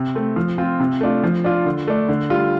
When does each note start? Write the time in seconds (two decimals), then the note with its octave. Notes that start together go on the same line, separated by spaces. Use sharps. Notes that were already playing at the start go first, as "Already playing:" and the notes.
Already playing: C3
0.15 A3 C4
0.36 F3
0.58 C4 F4
0.80 C3
1.01 A3 D4 F4
1.23 F3
1.44 D4 F4
1.66 D3
1.87 A3 D4
2.09 D3
2.30 G3 F4